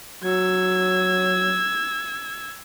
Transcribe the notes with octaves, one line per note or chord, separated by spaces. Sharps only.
F#3 E6 G#6